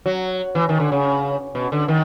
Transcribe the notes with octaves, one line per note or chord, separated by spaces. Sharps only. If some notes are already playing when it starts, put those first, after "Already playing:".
F#3
E3
D#3
D3
C#3
B2
D3
D#3